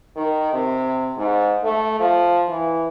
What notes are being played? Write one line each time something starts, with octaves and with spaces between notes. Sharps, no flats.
D#3
C3
G#2
A3
F3
E3